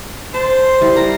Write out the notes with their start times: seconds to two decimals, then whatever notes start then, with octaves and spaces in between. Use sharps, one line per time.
0.34 C5 A5
0.81 G3 E4
0.96 A#4 A#5